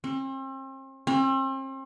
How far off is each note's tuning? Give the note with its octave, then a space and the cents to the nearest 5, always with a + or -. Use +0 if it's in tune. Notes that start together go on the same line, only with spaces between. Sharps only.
C4 +40
C4 +40